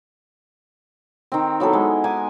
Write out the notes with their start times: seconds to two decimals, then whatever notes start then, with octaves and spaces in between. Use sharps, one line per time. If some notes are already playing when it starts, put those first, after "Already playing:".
1.32 D#3 C4
1.60 F#3 B3 E4 A4
1.73 G#3
2.04 D#4 G#5 D6